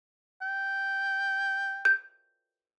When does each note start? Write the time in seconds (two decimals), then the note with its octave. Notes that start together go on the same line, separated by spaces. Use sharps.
0.42 G5
1.85 G6